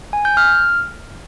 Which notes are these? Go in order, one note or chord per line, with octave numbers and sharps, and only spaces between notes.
G#5
G6
F6